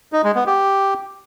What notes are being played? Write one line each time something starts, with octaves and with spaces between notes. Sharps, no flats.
D#4
G#3
B3
G4